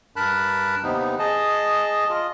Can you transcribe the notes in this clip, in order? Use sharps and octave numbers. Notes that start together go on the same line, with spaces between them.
G2 A#4 A5 B5 F#6
D#2 C3 B3 D#4
G#4 D#5 A5
F4 D#5